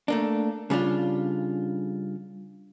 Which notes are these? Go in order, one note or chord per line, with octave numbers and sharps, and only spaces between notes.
A3 A#3 D4
C#3 G3 D4 F4